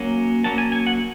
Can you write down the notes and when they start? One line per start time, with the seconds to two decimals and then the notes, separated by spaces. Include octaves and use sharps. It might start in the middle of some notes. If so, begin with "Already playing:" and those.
Already playing: F#3 A#3 C#4
0.44 F#3 A#3 C#4 A5
0.58 G#5
0.72 G#5
0.87 F#5